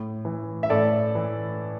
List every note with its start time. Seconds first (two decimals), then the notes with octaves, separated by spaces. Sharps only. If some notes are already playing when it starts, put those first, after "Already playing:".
Already playing: A2
0.25 E3
0.63 E5
0.70 A2 A4 D5
1.15 E3